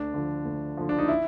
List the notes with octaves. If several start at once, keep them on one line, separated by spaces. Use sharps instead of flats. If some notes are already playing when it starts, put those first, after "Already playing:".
Already playing: D2 D4
D3 F3
D2
D3 F3
D4
D#4
E4